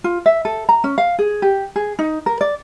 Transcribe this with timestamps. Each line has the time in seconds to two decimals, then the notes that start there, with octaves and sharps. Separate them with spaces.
0.04 F4
0.26 E5
0.45 A4
0.69 A#5
0.84 C#4
0.98 F5
1.19 G#4
1.42 G4
1.76 G#4
1.99 D#4
2.26 A#4
2.41 D5